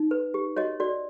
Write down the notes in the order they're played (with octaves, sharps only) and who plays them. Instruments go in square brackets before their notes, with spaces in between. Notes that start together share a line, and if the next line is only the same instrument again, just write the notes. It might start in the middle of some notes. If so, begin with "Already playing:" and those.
Already playing: [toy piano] D#4
B4
G4
F#4 C#5 D#5
F#4 D5